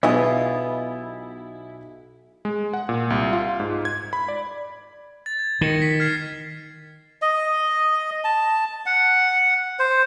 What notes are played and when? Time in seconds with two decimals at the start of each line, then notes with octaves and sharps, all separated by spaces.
0.03 B1 B3 E4 F4 G#4 D#5 G#5
2.45 G#3
2.74 F#5
2.89 A#2
3.10 C2
3.33 F4
3.60 G#2
3.85 G#6
4.13 B5
4.28 D5
5.26 A6
5.39 G#6
5.61 D#3 A#6 C#7
5.82 B6
6.00 F6 G#6 C7
7.22 D#5
8.24 A5
8.86 F#5
9.79 C5